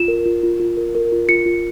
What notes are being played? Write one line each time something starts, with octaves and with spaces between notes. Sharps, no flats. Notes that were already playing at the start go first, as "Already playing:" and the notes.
Already playing: F4 E7
A#4
F4
F4
F4
A#4
A#4
F4
F4 C#7
F4